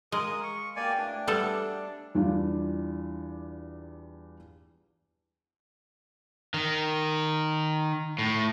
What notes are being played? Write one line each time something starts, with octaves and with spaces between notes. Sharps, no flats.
G#3 G#4 A#4 F5 D#6
C#6
B2 A#3 G4 D5 G5 G#5
A2 D4
G3 B3 A4 E5 F#5 G#5
E2 G3 D4 F4
D#3
A2